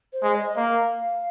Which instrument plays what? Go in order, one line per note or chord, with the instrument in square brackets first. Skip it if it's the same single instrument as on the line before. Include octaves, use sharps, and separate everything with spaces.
[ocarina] C5
[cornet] G#3
[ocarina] D#5
D#5
[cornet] A#3 [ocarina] F5